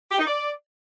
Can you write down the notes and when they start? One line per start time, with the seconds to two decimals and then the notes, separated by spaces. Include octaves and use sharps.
0.11 G4
0.19 D#4
0.26 D5